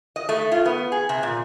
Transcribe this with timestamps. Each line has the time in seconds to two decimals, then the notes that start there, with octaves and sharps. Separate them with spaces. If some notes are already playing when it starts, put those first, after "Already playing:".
0.16 D#5
0.29 A3
0.52 F4
0.65 B3
0.92 G#4
1.09 C3
1.23 A#2